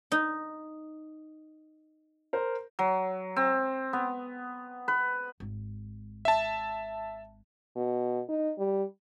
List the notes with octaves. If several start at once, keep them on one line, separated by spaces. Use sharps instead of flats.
D#4
A#4 C5
F#3
C4
B3
B4
G#1
E5 A5
B2
D#4
G3